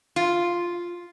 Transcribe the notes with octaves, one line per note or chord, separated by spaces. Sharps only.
F4